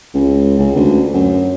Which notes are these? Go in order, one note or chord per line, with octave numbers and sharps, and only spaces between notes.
C#2
C#2
D2
F#2